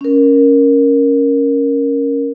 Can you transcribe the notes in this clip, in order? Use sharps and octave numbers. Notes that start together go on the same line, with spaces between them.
C#4 A#4